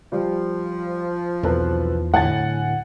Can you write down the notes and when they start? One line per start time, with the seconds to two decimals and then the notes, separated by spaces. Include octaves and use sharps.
0.12 F3 G3
1.43 B1 E2 C4 A4 B4
2.14 D1 A2 F#5 G#5 A6